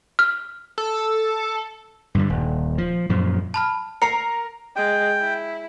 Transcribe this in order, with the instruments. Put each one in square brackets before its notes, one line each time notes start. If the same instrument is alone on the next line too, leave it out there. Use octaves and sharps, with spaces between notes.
[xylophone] F6
[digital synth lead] A4
[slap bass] G2 D3 G3
D#1
F3
F#2 A#2 F3
[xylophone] A5 B5 F6
[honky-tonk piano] A#4 A#5 [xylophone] C7 C#7
[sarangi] G#3 [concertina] G5
[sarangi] E4